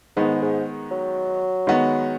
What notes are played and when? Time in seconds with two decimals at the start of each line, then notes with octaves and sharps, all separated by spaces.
0.16 G#2 D#3 G#3 B3
0.42 G#2
0.91 F#3
1.67 D#3 G#3 B3 F#4